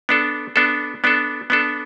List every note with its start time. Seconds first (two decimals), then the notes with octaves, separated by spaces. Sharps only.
0.09 B3 D4 A4
0.56 B3 D4 A4
1.04 B3 D4 A4
1.50 B3 D4 A4